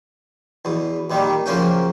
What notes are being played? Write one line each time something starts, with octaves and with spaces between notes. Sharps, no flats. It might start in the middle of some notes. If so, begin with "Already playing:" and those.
E2 B2
A#2 D#3 G3
F#2 C#3 F3 A#3 C#4 G5